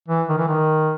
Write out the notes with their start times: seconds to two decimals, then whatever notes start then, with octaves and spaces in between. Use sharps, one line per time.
0.08 E3
0.29 D#3
0.38 E3
0.48 D#3